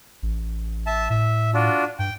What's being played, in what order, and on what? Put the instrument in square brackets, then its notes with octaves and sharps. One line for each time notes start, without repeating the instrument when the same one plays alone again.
[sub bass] A1
[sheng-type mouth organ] E5 A5
[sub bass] A2 [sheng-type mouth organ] E5
[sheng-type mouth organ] D4 F4 F#4
[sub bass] G2 [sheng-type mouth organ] G5